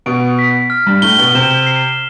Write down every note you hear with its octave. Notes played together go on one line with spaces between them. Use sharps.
B2 B3 D7
B6
F6
G2 G3
A2 A3 G7
B2 B3
C3 C4 E7
C7